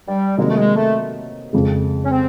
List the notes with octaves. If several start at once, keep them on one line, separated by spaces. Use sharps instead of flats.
G3
C3 D#3 F#3 G#3 A#3 D#4
A3
G#3
A3
F2 C#3 F3 G#3
C#4
C4